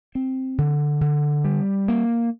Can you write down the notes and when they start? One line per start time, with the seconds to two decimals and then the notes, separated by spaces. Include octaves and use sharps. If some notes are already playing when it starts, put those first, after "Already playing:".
0.15 C4
0.58 D3
1.01 D3
1.45 G3
1.88 A#3